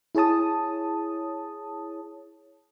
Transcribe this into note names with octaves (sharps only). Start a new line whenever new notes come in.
E4 G#4 C#5 A5 D#6